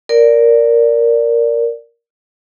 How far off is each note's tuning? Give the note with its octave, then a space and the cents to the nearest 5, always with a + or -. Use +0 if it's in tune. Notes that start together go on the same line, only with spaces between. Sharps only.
A#4 +0 D5 -10